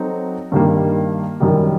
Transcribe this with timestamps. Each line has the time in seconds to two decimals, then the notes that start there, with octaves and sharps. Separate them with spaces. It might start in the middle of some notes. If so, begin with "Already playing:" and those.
Already playing: F#3 C4 D#4 F#4 A4
0.52 G2 D#3 G3 A#3
1.40 F#2 D#3 G3